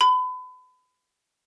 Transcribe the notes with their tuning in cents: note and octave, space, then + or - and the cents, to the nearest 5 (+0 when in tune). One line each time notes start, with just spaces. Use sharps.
B5 +35